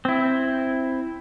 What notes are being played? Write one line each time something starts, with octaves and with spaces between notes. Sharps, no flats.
C4 E4